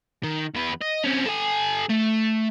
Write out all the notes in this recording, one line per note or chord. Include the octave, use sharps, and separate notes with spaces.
D#3
E2 B4
D#5
C4 C#4
A4 G#5
A3